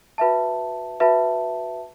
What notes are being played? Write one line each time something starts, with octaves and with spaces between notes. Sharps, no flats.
F#4 B4 E5 A5
F#4 B4 E5 A5